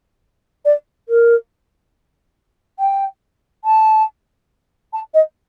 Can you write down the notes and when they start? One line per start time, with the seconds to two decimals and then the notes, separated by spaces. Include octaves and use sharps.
0.65 D5
1.09 A#4
2.79 G5
3.64 A5
4.93 A5
5.14 D#5